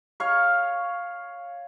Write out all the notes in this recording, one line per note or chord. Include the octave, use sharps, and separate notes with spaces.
C#5 F5 C#6